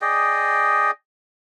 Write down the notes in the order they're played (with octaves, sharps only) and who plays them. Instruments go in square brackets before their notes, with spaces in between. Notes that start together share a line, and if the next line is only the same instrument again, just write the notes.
[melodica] G#4 D5 D#5 G5